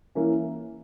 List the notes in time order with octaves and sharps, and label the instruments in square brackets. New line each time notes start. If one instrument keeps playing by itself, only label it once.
[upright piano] E3 A#3 C#4